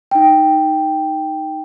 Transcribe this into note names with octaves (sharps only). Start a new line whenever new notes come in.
D#4 G5